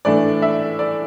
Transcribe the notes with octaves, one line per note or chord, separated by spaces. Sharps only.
A2 E3 A3 D4 D5
E5
D5